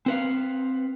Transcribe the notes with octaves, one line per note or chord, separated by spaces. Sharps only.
C4 B4 F5